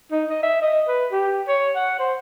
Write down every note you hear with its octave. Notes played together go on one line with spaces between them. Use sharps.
D#4
D#5
E5
D#5
B4
G4
C#5
F#5
C5